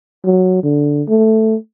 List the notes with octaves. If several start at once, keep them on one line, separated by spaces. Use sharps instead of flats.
F#3
D3
A3